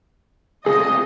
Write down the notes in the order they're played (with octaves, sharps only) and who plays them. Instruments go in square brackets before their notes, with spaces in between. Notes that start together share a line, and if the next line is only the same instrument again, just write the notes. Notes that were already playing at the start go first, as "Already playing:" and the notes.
[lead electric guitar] C#2 C3 [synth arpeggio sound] G#4 [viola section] D#5